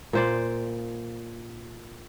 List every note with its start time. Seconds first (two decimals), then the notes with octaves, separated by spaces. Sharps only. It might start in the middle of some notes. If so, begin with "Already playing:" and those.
0.13 A#2 C5 D5